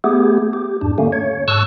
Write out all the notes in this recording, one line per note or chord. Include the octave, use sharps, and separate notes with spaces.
A3 B3 G4 G#4
G4
E2 G#2 D4
D3 A3 A#3 C#4
C#5
G#2 A5 C#6 E6 F#6